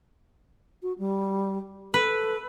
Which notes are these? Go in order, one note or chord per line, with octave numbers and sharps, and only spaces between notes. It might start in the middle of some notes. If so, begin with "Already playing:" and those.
F#4
G3
A4 B4